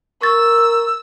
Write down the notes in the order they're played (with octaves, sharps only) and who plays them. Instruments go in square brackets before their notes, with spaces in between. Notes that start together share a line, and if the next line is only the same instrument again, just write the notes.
[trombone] A#4 [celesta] C#6 A6 [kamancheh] E6